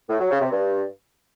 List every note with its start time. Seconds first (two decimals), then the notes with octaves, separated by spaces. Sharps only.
0.09 A2
0.20 F#3
0.31 C#3
0.41 C3
0.52 G2